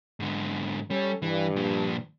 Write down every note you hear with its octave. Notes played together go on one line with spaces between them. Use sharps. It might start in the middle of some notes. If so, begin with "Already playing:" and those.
G#2 D3
G3 C#4 A4
G2 E3
A#2 F3